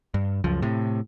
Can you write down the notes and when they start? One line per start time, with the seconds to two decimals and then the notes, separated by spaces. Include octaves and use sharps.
0.14 G2
0.44 C#2 F#2 F3
0.62 A2 C3